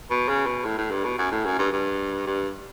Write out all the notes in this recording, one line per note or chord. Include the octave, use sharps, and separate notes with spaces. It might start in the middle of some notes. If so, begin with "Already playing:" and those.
B2
C#3
B2
A2
A2
G2
B2
F#2
A2
F#2
G2
G2
G2